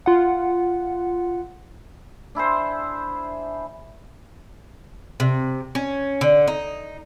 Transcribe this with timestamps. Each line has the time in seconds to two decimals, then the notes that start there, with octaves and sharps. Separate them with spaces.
0.06 F4 F#5
2.35 D4 E4 G#4 C5
5.20 C3
5.75 C#4
6.21 D3
6.48 D#4